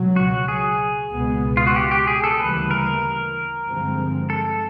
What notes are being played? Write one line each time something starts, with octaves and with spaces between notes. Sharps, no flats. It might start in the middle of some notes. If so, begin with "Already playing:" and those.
Already playing: C#2 B2 F#3
F#4
G#4
C#2 B2 G#3 B3
F4
F#4
G4
G4
G#4
A4
D2 C#3 E3 G3 A#3 B4
A#4
G2 D3 F3 G#3 C4
A4